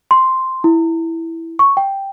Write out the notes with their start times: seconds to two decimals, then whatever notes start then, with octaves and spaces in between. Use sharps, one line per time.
0.11 C6
0.64 E4
1.59 C#6
1.77 G5